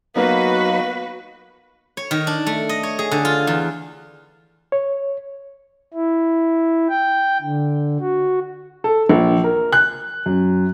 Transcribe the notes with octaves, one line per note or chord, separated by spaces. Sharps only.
F#3 A#3 B3 D#4 F#4 B4 F5
C#5
D#3
D4
A3
D#5
C#5
G#4
D3
F4
E2
C#5
E4
G5
D3
F#4
A4
A#1
A#4
F#6
F#2